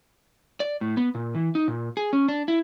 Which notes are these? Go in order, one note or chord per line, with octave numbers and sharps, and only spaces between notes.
D5
A2
B3
A#2
E3
D#4
A#2
G#4
C#4
D4
E4